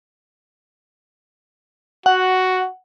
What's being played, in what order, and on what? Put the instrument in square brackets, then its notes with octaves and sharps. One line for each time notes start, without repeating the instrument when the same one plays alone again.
[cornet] F#4 [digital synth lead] F#5